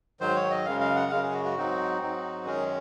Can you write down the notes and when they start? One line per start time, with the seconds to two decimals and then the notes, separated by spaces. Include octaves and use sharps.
0.20 G#2 D#3 F#3 C5
0.36 C#5
0.50 D#5
0.65 F#2 C#3 G#3 F5
0.81 F5
0.96 F#5
1.11 F#2 C#3 G#3 F5
1.22 G#4
1.33 F#4
1.45 F#4
1.56 G#2 F#3 C4 D#4
2.01 G#2 F#3 C4 D#4
2.45 F#2 D#3 G#3 C#4 G#4